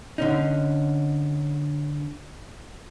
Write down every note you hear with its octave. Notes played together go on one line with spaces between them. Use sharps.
D3 C#4 D#4